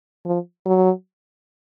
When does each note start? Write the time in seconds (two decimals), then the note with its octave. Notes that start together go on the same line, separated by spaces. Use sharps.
0.25 F3
0.66 F#3